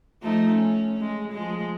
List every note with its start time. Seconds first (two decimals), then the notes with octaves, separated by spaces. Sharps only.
0.22 F3 A3 D#4
0.54 C#4
1.00 G#3
1.32 F3 G#3